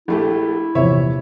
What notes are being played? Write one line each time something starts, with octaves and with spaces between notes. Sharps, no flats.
A#1 A3 E4 G4
A#1 E2 C3 C#5 E5